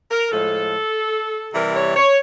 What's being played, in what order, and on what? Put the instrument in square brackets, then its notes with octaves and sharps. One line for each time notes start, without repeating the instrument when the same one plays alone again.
[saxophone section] A#4
A2 F3 G#3 A4
C3 E3 G3 A#4
C#5
C#5